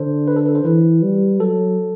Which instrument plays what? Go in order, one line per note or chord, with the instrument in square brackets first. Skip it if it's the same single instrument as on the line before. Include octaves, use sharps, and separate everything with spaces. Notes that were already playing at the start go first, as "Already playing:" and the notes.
Already playing: [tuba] D3 [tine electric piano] A4 C5
[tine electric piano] B4
A4
B4
A4 C5
[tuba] E3 [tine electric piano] B4
[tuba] G3
[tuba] F#3 [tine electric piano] A4